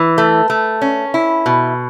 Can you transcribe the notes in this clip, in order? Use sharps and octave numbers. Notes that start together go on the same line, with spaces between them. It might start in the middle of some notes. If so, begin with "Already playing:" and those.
Already playing: E3
A3
A3
C#4
E4
B2